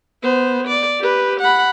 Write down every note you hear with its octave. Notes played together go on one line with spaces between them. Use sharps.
B3 C5
D5
G4 B4
F#5 B5